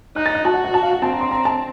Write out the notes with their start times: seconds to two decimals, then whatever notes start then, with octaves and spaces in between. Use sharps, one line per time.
0.16 D#4 F#6
0.26 A6
0.35 F#6
0.44 F#4 A5
0.54 F#5
0.64 F#5
0.74 A5
0.83 F5
0.93 F#5
1.02 C4 A5
1.12 A#5
1.21 C6
1.31 A#5
1.45 A5